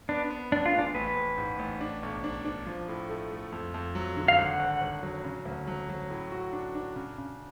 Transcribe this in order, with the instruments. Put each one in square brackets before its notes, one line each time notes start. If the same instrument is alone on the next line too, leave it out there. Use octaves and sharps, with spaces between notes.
[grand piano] B3 [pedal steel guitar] D4
[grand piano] B3
[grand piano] A1 [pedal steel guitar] D4
[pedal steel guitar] F4
[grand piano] G#3
[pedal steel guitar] D4
[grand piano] A1 [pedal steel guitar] B4
[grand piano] A1
G#2
A1
D4
B1
D4
D4
F3
A2
A3
A3
F2
F2
F#3
D3
[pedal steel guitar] F5
[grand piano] G#1 [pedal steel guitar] F#5
[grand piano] G#1
G#1
F#3
C#3
D2
F#3
F#3
A2
F#4
D4
D4
C#3
C#3